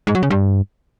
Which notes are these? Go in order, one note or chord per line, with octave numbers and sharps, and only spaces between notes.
G#2
F#3
C#3
G2